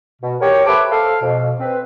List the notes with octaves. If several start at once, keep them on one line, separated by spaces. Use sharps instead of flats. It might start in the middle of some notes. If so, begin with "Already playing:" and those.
B2
G4 A#4 C#5
A4 B4 C5 E5 D6
A4 C5 F5
F2 B2
C4 B4